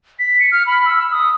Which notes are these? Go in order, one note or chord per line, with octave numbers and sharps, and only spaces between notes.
B6
C#7
F6
B5
E6
D#6